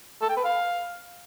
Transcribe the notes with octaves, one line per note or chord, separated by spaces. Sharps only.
A4
G5
B4
F5